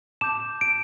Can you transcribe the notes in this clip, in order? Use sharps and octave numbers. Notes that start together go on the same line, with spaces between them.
A5 D6 G6 E7
D7